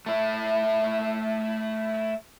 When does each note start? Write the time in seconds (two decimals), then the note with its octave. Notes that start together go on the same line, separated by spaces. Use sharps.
0.06 A3 E4